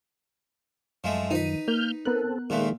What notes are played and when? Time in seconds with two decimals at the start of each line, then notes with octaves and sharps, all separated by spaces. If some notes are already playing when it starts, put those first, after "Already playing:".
1.04 F#2 F3 G#3 A3
1.31 D#3 F3 D#4 B4 D#7
1.68 A#3 F6 G6
2.05 B3 C4 A4 A#4 F#6
2.50 A#2 D#3 F3 G#3 A3